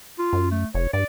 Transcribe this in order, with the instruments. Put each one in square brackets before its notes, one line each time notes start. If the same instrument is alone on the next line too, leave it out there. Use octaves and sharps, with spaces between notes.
[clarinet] F4
[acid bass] F#2
[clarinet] A3
[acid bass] F1 [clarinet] C#5
[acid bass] G2 [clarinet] D5